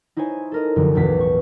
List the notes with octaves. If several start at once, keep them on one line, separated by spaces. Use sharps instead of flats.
D#4 E4 C5 C#5 G#5
A4 A#4 D#5
F1 F#2 D3
E1 A1 E2 B6
C#6